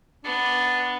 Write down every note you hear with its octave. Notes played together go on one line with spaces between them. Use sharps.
B3 D4